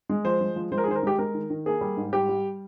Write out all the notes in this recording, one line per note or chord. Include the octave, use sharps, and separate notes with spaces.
G#3
F3 C5
G#3
F3
G#3 C5
A#4
G#4
D#3 C5
A#4
G#3 G4
G#3 A#4
D#3
D#3
A#3 G#4
G3
G#2
G3 G4
G3